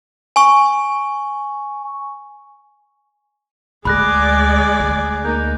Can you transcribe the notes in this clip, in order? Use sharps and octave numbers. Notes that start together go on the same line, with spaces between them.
G#5 C#6
D2 G#3 G#4 D5 B5 F#6 A#6
D2
A#3 D#4 G6